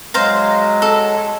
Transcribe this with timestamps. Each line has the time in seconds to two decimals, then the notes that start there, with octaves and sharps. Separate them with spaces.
0.14 F#3 G#3 C5 F5 A#5
0.82 A4